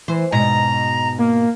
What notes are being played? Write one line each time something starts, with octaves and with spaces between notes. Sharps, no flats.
E3 C5
G#2 B2 A#5
A#3